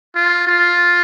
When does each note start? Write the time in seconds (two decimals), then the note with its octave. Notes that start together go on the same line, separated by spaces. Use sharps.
0.15 F4
0.47 F4